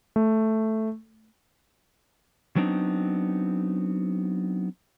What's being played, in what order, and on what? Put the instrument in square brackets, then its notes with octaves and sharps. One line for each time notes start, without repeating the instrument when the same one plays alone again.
[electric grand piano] A3
[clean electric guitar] F#3 B3 C4 D4 D#4